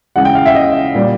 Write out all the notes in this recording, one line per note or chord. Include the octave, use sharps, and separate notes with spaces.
C#3 E3 G#3 F#5
G5
F5
E5
D#5
A#2 G3